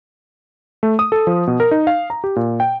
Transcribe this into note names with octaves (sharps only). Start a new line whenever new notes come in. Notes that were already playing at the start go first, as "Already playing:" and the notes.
A3
D#6
A4
F3
B2
A#4
D#4
F5
A#5
G4
A#2
G5